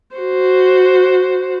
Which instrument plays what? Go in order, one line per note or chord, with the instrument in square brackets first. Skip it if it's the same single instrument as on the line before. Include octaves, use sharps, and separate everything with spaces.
[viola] F#4 C5